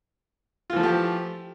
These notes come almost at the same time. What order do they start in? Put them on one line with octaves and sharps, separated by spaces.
F4 E3 F3 A3 G4